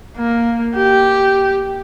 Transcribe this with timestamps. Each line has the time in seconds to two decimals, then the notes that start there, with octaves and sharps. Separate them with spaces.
0.17 A#3
0.75 G4